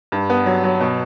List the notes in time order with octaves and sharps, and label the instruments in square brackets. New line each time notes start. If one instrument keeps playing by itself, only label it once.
[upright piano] G2
B3
F#3
F#3
B2